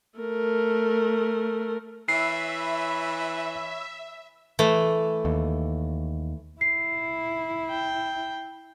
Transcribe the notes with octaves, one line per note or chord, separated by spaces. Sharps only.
A3 A#4
E3 C#5 E5 B5 C#6 C7
E3 A3
D#2
E4 C7
G5